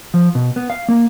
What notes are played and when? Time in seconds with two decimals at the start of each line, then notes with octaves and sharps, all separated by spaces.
0.14 F3
0.35 B2
0.56 B3
0.70 F5
0.89 A#3